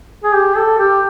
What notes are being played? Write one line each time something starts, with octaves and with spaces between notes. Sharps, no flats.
G#4
G4
A4
G4